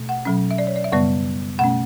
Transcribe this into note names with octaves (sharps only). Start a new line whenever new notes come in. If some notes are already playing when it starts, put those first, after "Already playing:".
Already playing: B2 A3
F#5
B2 F#3 C#4
E5
D5
C#5
D5
E5
F#2 C#3 G3 B3 D5
B2 A3 C#4 F#5